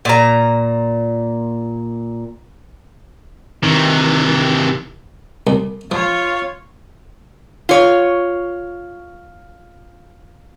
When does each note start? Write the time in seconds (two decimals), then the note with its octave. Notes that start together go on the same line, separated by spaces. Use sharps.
0.05 A#2 A#5
3.63 C3 D#3 E3
5.47 C2
5.92 F3 F4 C#5
7.69 F4 C#5